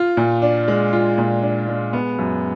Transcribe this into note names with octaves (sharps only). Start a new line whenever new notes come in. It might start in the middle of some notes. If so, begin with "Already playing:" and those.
Already playing: F4
A#2
D4
G#3
F4
A#2
D4
G#3
B3
F#2